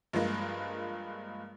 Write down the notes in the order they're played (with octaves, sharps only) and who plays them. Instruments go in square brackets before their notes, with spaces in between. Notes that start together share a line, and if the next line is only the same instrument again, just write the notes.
[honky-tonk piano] G2 F3 G#3 A#3